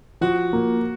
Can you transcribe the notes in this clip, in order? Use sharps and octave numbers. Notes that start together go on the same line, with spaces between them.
F3 F#4
A#3